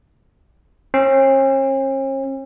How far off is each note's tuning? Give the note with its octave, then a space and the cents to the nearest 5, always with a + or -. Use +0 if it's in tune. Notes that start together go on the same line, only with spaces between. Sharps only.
C#4 -45